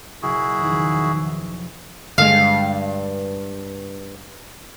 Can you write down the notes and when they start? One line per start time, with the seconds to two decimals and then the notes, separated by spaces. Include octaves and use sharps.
0.22 F#1 B1 E4 F#4 G#4
0.63 E2 D#3 F3
2.18 G2 D3 G#3 F5